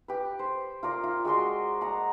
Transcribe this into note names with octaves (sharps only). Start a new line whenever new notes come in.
G4 B4
C5
F4 A#4 D5
F4
G#3 F#4 D5 C6
D#5 F#5 A#5